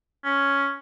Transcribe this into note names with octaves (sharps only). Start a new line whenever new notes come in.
C#4